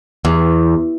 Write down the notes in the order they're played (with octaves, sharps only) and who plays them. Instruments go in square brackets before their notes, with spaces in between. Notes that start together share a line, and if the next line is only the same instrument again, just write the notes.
[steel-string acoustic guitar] E2